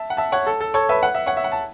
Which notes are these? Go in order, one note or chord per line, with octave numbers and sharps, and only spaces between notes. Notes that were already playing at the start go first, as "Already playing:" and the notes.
Already playing: E5 A5
F#5
E5 A5
C#5 F#5
A4
A4
A4 C#5
B4 E5
F#5
E5
C#5 F#5
E5
F#5
A5